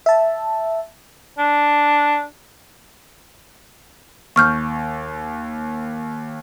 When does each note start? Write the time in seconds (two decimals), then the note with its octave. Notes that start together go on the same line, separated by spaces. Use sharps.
0.06 E5 A5
1.38 D4
4.36 D#2 C#6 F6 G6